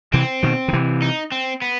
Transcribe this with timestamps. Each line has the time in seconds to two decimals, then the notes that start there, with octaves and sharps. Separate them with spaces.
0.13 C3 E3 C4
0.43 B2 D#3
0.68 D#3
0.73 C3 E3
1.02 D#4
1.32 C4
1.62 B3